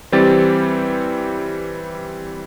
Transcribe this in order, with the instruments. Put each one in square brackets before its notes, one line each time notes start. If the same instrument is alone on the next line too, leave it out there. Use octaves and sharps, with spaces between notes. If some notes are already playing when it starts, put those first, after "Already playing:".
[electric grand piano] E3 G3 C4 G4 A6